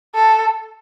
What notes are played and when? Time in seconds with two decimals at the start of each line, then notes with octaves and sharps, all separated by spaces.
0.15 A4